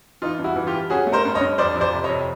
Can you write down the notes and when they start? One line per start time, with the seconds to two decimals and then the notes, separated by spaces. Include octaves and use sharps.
0.22 E3 D#4 F4
0.38 G2
0.44 E4 F#4
0.56 E3
0.67 F4 G4
0.73 G2
0.90 C#4 F#4 G#4
1.07 A3
1.12 A#4 C5
1.25 G2
1.35 C#5 D#5
1.41 G2
1.58 F2 C5 D5
1.75 F2
1.81 C5 D5
1.93 C3
2.04 C#5 D#5
2.09 F2